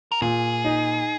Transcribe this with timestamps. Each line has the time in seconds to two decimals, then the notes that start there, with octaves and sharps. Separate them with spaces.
0.12 A#4
0.22 A#2 G#4
0.64 D#4